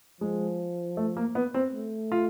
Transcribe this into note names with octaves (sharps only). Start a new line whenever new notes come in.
F3 G#3
A3
A#3
B3
C4
A3
F4